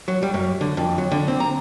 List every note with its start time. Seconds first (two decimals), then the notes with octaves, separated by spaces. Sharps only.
0.08 F#3
0.23 G3
0.34 F#2
0.61 D3
0.77 F2
0.98 F#3
1.11 D3
1.28 C4
1.40 A#5